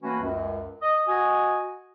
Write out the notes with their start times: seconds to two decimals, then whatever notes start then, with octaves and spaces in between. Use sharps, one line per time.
0.03 E3 A3 A#3 C#4 F#4 B4
0.22 C#2 F#2
0.82 D#5
1.08 F#4 D#5 G#5